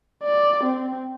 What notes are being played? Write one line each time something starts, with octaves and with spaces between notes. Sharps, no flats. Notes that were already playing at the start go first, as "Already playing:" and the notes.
D5
C4